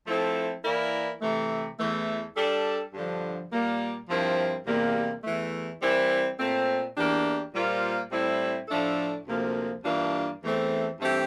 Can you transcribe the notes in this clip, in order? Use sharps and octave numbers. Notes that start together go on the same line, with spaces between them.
F3 A3 C4 E4 A4
E3 A#3 E4 A#4 D5
C3 E3 A3
E2 E3 A3
G3 D4 A4
G2 D3 F3
A#2 G3 A#3
G2 F3 C4 E4 A#4
E2 C3 G3 A#3
E2 E3 A3
E3 G3 C4 E4 A#4
A#2 A3 C4
E2 E3 A#3 D4 G4
A#2 G3 A#3 F4 C5
A2 G3 C4 E4
A2 F3 A3 D4 A4
D2 C3 F3 A#3
G2 E3 A#3 D4 F4
E2 E3 A3 C4
G2 E3 A3 C4 G4